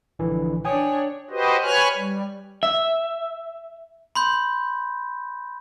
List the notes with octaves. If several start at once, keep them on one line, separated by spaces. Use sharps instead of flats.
A#1 D3 E3
D4 C#5 G5 G#5 D#6
F#4 G4 B4 C5 D#5
B4 C#5 G#5 F6 F#6
G3
E5
B5 C6 G6